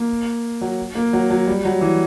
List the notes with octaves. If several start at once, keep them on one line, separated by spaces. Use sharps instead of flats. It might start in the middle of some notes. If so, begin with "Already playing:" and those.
Already playing: A#3
F#3
A#3
F#3
F#3
G3
F#3
E3